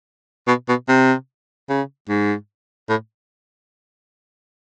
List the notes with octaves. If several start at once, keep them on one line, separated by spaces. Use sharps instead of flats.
B2
B2
C3
C#3
G#2
A2